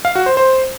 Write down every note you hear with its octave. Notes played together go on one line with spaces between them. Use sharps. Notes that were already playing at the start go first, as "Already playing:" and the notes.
F5
F#4
C5
C5